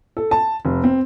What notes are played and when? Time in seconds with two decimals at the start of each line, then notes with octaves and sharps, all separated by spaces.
0.17 A4
0.31 A5
0.65 F1
0.84 C4